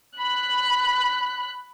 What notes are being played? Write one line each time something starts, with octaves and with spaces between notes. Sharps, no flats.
B5 F#6